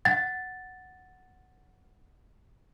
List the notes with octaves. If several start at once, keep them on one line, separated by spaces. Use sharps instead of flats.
F#5 A6